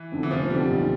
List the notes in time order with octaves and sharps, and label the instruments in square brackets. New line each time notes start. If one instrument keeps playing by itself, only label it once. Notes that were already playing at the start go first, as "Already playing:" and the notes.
Already playing: [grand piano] E3
[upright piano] F2 D3
[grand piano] E3
[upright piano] F1 [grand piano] F3
[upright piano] F2 D3 [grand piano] G3
[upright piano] B1